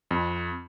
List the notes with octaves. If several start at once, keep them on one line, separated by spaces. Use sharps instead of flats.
F2